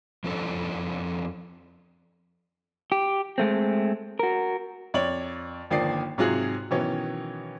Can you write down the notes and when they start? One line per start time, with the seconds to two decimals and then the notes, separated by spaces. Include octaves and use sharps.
0.24 F2 F3 C#4 D4 A4
2.92 G4
3.38 G#3 A3 C4
4.19 F#4 A#4
4.94 F2 C#5 D5 F#7
5.71 G1 D#3 F3 A#3 D5 C7
6.18 G#2 C3 F#3 F4 G#4 F#6
6.70 B2 D#3 E3 F#3 C#4